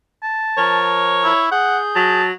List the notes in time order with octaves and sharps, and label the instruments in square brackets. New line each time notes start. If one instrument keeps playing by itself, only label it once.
[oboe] A5
[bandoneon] F3 A#4 [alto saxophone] C#5
[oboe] E4
[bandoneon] G#4 G6 [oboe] F#5
[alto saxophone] F#3 [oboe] A5